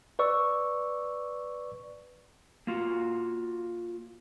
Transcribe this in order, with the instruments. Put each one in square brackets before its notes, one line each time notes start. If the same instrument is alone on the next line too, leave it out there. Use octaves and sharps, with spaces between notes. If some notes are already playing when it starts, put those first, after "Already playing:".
[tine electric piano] B4 D5 C#6 E6
[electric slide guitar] A#3 F4 F#4